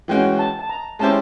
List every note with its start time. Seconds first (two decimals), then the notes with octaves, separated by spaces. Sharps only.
0.08 E3 G#3 C#4 F#4 G5
0.39 A5
0.59 A5
0.69 A#5
0.99 G#3 C#4 E4 G4 C5 A5